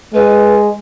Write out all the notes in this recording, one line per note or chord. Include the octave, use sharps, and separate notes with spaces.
G#3 B4